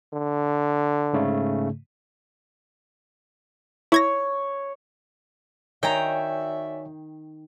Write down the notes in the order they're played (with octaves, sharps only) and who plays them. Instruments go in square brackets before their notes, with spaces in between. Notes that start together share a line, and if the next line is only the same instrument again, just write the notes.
[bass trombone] D3
[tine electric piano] G#2 C#3 A3
[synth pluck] E4 G#6 A#6 [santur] C#5
[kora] D#3 [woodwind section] F#4 D5 E5 [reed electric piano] C#5 G#5 [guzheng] G5 A#5